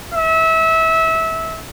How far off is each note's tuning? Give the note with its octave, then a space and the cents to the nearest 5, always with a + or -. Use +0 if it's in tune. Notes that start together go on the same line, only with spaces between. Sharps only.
E5 -25